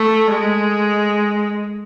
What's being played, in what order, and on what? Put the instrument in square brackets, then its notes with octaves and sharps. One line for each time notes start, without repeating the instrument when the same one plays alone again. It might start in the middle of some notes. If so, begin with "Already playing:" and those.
Already playing: [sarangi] A3
G#3